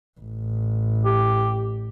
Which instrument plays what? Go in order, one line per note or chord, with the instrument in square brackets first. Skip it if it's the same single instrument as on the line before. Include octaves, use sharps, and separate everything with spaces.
[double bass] A1
[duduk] G4